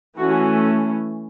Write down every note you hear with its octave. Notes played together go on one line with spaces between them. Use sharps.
E3 A3 C#4 F#4